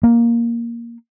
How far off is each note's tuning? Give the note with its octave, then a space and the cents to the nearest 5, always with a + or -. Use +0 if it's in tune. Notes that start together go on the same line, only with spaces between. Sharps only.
A#3 +5